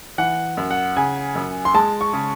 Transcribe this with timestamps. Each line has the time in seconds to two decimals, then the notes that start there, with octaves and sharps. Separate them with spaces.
0.18 E3 F#5
0.57 F#2
0.71 F#5
0.96 C#3 G#5
1.35 F#2
1.65 C6
1.74 G#3 A5
2.01 C#6
2.13 C#3